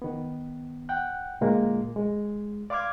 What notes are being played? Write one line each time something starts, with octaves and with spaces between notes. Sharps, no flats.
D#3 B3
F#5 G5 F#6
A#2 D3 G#3 A#3 F4
G#3
D5 F5 C6 D6 F6 G#6